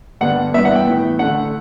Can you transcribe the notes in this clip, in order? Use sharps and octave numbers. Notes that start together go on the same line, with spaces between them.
G2 D3 G3 B3 D4 F#5
G2 E3 B3 E5
F#5
G5
A2 E3 B3
D3 A3 D4 F#5